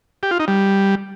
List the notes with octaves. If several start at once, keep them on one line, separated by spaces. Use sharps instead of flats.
G4
F4
D#4
G3